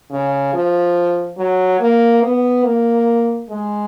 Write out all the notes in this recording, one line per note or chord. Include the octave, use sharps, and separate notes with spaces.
C#3
F3
F#3
A#3
B3
A#3
G#3